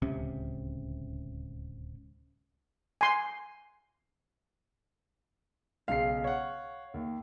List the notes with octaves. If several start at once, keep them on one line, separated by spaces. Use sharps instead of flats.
D1 C#2 C3 C#4
G#5 C6
B1 C#3 F5 C7
C#5 F#5
D#2